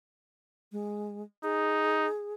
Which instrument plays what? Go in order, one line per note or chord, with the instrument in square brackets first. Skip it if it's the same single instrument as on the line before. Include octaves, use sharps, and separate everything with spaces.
[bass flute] G#3
[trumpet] D#4 [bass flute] G#4